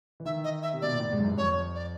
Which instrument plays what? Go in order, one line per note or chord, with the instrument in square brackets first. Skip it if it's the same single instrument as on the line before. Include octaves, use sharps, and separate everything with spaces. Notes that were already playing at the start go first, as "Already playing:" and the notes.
[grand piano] E3
[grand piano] D#3 [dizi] E5
[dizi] D#5
E5
[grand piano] C3
[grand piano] B2 [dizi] D5
[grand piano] A#2
A2
G#2
F#2
G2
[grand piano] F2 [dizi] C#5
[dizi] D5